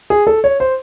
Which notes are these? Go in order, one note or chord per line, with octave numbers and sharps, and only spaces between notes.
G#4
A4
C#5
C5